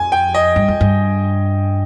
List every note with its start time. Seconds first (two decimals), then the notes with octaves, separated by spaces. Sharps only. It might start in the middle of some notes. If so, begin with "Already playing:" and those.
Already playing: F2 G#5
0.12 G5
0.34 D#5
0.56 G2
0.68 F2
0.81 G2